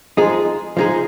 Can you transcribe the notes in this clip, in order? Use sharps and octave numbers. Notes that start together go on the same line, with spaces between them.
F3 G#3 D#4 G#4
F3 G#3 D#4 G#4